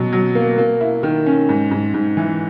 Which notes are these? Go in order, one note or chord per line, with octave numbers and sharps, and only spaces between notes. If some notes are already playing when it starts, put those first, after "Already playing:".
Already playing: B2 F#3
F#3
A#3
A#3
E4
D#3
C#4
G#2
G#2
G#2
E3